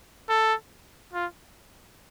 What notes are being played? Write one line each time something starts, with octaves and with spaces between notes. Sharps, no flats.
A4
F4